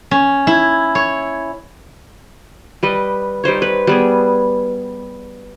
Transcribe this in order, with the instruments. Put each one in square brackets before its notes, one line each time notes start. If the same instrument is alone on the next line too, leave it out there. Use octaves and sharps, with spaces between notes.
[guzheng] C#4
E4
C#5
[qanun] G3 B4 D#5
G3 D#4 C5 C#5
B4
G3 B3 G#4